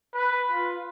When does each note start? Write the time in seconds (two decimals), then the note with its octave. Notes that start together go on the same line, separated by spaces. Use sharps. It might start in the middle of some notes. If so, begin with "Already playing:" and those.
0.14 B4
0.51 F4